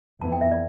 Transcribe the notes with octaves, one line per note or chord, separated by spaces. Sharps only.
F2 E3 B3 A5
G5
E5
D5